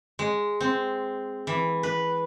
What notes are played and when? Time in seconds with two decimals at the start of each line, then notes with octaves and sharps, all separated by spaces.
0.19 G#3
0.61 C4
1.47 E3
1.83 B4